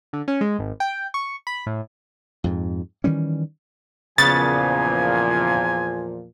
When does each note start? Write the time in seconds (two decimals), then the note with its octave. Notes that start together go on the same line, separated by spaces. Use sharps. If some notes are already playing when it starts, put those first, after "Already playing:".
0.13 D3
0.28 C#4
0.41 G#3
0.59 G#1
0.80 G5
1.14 C#6
1.47 B5
1.66 A2
2.44 F2 G#2
3.04 D#3 E3 G3 C#4
4.18 E2 A#2 C#3 F3 B3 G#5 A6